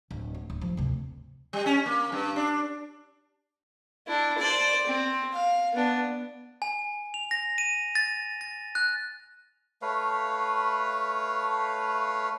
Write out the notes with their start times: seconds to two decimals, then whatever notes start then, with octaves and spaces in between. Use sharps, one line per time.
0.11 D1
0.35 A#3
0.50 D1
0.61 F3
0.77 D2 C3
1.53 G3
1.66 C#4
1.86 A#3
2.12 G2
2.36 D4
4.08 D4 E4
4.38 C5 D5
4.86 C4
5.33 F5
5.74 B3 D4
6.62 G#5
7.14 F7
7.31 A#6
7.58 D#7
7.95 A6
8.41 A6
8.75 F#6
9.82 A3 B4 C#5 F5